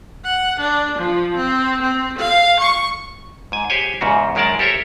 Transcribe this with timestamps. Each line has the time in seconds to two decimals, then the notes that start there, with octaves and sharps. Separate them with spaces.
0.24 F#5
0.59 D4
0.98 F3
1.36 C4
1.81 C4
2.18 F5
2.60 C#6
3.52 G#2 G#5
3.70 G4 G#4 C5 C#5 G#5
4.01 E2 G#2 C#3 F#4
4.35 F#2 D#3 G#3 A#4 D5 A5
4.59 G4 A4 A#4 C5 C#5 E5